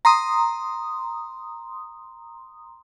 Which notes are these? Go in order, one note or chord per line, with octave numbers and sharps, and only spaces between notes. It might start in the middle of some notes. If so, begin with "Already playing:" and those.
A#5 C6 D#6